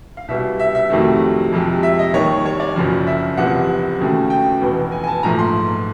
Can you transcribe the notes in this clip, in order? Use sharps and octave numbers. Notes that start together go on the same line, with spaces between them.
F5
C2 B2 G3 E5
E5
E5
F2 C3 D#3 F#3 A3
F2 C3 F3 G#3
E5
D#5
D#2 D#3 G3 C#5
C#5
D5
F#1 F#2 C#3 F3
E5
F#1 E2 C3 F3 F#5
D#2 C#3 F#3 A3
G5
F1 E2 B2
G#5
G#5
A5
A#1 G#2 F3 A3 A#5
C6